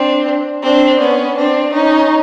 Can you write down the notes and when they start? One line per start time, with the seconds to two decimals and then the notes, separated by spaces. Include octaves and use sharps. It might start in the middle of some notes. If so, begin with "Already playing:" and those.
Already playing: C4 D4
0.63 C4 D4
0.99 B3 C#4
1.36 C4 D4
1.73 C#4 D#4